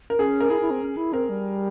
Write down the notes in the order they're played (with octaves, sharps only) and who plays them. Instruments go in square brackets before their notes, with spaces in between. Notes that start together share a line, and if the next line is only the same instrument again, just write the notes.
[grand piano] A#4
[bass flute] C#4 [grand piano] G#4
[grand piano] A#4
[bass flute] E4 [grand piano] G#4
[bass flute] E4
C4
C#4
E4
[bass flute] C4 [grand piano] A#4
[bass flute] G3